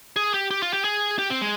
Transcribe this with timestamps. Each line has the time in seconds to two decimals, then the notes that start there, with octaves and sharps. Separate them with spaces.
0.16 G#4
0.34 G4
0.51 G4
0.63 F4
0.73 G4
0.84 G#4
1.19 G4
1.30 C4
1.41 G#3